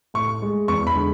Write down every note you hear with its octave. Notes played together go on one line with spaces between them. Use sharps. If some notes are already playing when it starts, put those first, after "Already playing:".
A2 C#6
G#3
E2 C#6
B5
D3 G#3